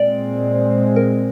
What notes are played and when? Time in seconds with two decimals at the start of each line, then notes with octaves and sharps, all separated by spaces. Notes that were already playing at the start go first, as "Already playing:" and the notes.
Already playing: A#2 G#3 C4 D5
0.96 A#4